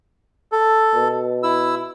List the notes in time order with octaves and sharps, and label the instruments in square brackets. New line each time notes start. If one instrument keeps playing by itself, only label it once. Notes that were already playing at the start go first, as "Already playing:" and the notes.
[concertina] A4
[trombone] B2
[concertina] E4 E6